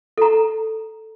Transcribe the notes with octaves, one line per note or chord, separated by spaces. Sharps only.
A4 A#5